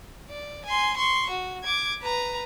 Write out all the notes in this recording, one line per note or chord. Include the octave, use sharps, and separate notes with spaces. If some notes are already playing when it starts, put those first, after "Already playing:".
D5
G#5 C6
C6 C#6
F#4
D6 G#6
B4 A#5